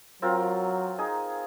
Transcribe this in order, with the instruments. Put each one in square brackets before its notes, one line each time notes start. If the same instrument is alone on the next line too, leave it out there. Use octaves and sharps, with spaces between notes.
[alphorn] F#3 [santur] C4 F4 A#4
[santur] D#4 G#4 G#5